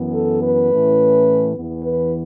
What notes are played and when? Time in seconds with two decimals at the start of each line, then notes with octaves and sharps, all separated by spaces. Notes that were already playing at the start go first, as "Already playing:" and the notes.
Already playing: F#2 E3 B3
0.14 A4
0.42 B4
0.70 A2 E3 A3 C#4
1.55 E2 E3 B3
1.83 B4